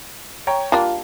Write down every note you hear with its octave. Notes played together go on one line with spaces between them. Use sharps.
C#5 G5 A#5
G3 A#3 D4 F4